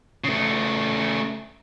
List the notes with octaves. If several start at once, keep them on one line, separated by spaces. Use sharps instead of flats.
C#3 A3